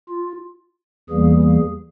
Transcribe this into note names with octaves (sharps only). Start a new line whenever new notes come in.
F4
E2 E3 G3 A#3 G#4
G#4